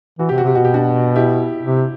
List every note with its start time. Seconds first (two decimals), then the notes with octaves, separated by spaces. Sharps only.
0.19 E3 F#4
0.29 C3 G4
0.38 F#4
0.43 C3 G4
0.55 B2 F#4
0.65 G4
0.74 D4 F#4
1.16 E4 G4
1.64 C3